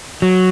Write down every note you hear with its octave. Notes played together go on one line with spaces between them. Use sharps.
F#3